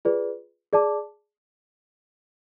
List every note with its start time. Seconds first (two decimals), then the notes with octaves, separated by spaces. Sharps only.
0.05 F4 G#4 B4 D5
0.73 G#4 D5 A5 D6